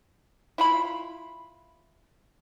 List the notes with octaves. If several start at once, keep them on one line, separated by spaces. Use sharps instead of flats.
E4 F4 B5